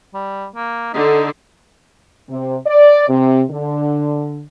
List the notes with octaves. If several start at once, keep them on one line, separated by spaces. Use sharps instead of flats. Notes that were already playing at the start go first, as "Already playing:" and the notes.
G3
A#3
D3 D#4
C3
D5
C3
D3